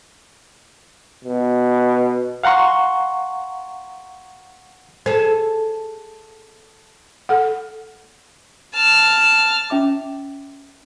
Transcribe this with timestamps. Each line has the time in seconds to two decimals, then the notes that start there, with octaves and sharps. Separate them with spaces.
1.24 B2
2.43 F5 F#5 A#5 C6 C#6
5.06 G#4 A4 C5
7.29 A4 F#5
8.74 A5 F6
9.70 C#4 E5 D6